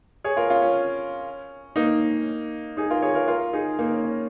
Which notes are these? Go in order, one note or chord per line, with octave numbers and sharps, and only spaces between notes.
G#4 C#5
F4 A#4
C#4 F4
C#4
A#3 D#4
D#4 G#4
F4 A#4
G#4 C#5
F4 A#4
F4 A#4
D#4 G#4
A#3 D#4
C#4
C#4